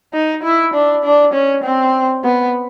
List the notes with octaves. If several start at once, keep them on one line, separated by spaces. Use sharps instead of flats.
D#4
E4
D4
D4
C#4
C4
B3